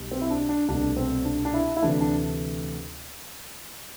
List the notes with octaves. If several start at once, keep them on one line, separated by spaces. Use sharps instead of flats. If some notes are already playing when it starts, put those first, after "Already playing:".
Already playing: B1 B2 G3
C4
E4
D4
D4
C2 B2 A3 D4
C4
D4
D4
E4
E4
D2 C3 E3 A3 D4
D4